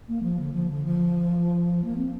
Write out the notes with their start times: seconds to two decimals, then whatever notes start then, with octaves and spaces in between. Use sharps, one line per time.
0.08 A#3
0.23 F3
0.39 D3
0.54 F3
0.70 D3
0.85 F3
1.84 A#3
1.97 C4